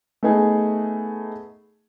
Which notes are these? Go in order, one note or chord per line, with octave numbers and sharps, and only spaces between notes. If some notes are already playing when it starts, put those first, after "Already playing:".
A3 B3 D#4 G#4